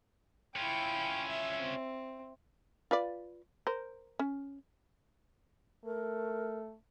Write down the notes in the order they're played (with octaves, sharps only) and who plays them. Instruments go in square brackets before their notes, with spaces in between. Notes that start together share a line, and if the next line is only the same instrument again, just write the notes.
[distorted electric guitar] C#4 F4 [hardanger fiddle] E4 G5
[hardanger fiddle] E5
C4
[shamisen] F4 B4 D5
A#4 C5
C#4
[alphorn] A3 [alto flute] A#4